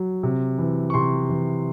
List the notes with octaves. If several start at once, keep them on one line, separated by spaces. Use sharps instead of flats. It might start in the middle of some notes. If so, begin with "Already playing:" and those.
Already playing: F#3
C3
E3
C#6
C3 C6
E3